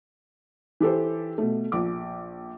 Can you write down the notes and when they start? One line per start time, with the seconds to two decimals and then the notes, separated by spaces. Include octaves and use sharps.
0.80 E3 G4 A4 C5
1.38 B2 A3
1.72 A#1 D6